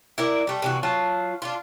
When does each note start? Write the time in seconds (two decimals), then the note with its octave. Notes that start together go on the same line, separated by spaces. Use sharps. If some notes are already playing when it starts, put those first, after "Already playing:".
0.18 E4 A#4 D5
0.47 G3 A3
0.62 C3 E3 F#4
0.83 F#3 F4 A5
1.42 D4 F4